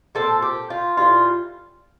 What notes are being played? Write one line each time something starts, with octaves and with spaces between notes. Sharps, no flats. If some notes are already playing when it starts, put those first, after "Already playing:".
A#2 F3 C4 A4
G4
F4
A2 E3 G3 F4